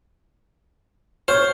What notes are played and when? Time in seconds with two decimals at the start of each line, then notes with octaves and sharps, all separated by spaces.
1.28 C5 C#5 C#6 F6